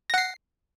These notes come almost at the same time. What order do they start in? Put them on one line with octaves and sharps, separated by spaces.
A#6 F#5 C7